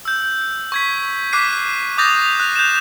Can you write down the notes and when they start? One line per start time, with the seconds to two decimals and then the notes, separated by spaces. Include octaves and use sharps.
0.05 E6 G6
0.72 C#6 G#6 B6
1.33 D6 F#6 B6 C7 D#7
1.97 D6 D#6 G6 A6 A#6 F7
2.40 F#6
2.56 G6 E7